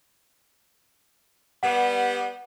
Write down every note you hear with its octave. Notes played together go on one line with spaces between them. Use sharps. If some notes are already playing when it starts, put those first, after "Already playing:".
G3 B3 F#5